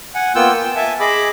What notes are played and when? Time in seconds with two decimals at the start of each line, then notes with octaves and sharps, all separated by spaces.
0.15 F#5 G#5
0.35 A#3 B3 F4 G5 E6 G6
0.56 G5
0.76 E5 G#5 A5
1.00 G#4 D#5 B5 D6